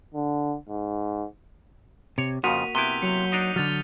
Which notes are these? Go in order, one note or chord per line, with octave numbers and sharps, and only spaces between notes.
D3
G#2
C3 C#5
F2 C#3 F3 A#3 F#4 B6 D#7 F7
C3 B3 E4 G6 D#7 G7
F#3 C#7 F7
D4 D#4 A#5 D#6
D3 F#3 F6 A6 F7